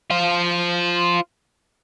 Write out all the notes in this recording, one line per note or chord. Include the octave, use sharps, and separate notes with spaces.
F4 C5